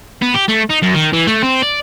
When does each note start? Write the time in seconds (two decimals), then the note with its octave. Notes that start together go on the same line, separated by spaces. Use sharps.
0.22 B3
0.34 G4
0.49 A3
0.70 D#4
0.83 F#2
0.95 D#3
1.13 E3
1.27 A3
1.42 C4
1.62 D5